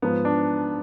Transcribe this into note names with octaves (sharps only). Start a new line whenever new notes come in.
G#2 F3 B3
D4